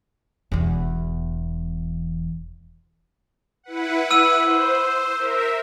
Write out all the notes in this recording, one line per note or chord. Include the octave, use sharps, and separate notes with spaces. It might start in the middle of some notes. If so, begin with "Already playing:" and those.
E1 E2
E4 B4 F#5
E6 D#7
C5
A#4 E5